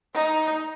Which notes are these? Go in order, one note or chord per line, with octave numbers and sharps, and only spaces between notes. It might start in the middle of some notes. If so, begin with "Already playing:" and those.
D#4